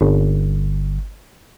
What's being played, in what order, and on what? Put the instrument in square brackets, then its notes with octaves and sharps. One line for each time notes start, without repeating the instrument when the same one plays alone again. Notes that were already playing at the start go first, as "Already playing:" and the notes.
[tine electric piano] G1